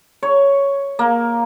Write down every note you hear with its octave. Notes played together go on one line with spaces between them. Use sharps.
C#5
A#3